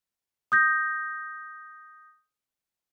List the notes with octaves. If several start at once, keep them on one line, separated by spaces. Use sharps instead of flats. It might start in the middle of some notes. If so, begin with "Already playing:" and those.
D#6 G6 A#6